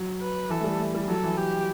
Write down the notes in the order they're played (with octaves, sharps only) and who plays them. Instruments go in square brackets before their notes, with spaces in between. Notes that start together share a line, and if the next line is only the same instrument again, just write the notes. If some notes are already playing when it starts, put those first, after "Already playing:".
Already playing: [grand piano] F#3
[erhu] B4
[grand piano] E3 [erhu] A4
[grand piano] A3
G3
A3
G3
[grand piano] F#3 [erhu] A4
[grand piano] E3
[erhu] G4